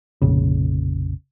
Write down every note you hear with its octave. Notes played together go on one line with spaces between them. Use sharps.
F1 A#1 C#3